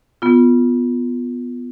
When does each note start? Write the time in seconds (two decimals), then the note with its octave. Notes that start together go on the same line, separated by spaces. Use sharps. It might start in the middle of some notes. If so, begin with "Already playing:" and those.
0.22 B3 F4